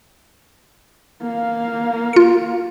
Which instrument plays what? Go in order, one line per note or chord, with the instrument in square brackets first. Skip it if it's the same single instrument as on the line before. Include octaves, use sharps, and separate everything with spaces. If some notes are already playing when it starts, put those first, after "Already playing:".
[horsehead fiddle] A#3 F5
[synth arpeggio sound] F4 C#7